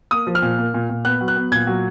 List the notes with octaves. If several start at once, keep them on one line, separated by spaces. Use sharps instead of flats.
A#3 D#6
F3
F6
A#2
A#3
A#2
A#2
B3 F#6
F#3
F#6
B3
A#2 G#6
F#3